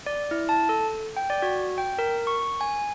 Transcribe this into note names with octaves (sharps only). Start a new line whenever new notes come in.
D5
E4
A5
A4
G5
D5
F#4
G5
A#4
C#6
G#5